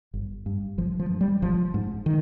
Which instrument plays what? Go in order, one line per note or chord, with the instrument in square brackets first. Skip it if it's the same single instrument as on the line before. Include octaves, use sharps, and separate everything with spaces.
[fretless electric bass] G1
G2
G1 F3
F3
G2
G3
G#1 F3
G#2
D#3